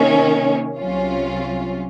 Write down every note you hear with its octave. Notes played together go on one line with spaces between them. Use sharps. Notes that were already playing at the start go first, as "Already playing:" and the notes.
Already playing: C3 D#3 A#3 C#4
C2 C3 F#3 C#4 F4